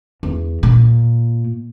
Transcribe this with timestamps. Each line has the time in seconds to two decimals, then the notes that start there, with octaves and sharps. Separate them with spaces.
0.23 E2
0.63 A#2